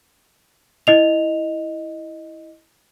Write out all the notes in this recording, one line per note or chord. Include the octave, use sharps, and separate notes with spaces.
E4 D#5 F7